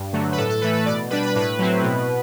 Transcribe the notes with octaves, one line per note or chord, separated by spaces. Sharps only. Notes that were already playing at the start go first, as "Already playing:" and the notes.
Already playing: G2
D3 F#3 A3
B4
A2 A4
A4
E3 A3 B4
B4
B2 D5
G3 D4 B4
B4
A2 B4
F#3 C4 E4
B2